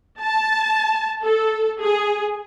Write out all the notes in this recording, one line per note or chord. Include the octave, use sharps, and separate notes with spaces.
A5
A4
G#4